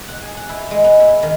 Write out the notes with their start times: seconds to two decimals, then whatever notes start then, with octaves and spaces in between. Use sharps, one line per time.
0.08 F#5
0.22 G#4
0.37 F#5
0.49 E4
0.71 G#3
0.84 B3
1.00 E4
1.23 D#3